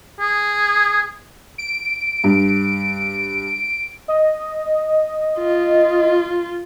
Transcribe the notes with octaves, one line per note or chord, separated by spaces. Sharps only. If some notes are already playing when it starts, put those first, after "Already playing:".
G#4
D7
G2
D#5
F4